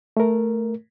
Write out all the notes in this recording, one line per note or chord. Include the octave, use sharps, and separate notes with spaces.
A3 A#4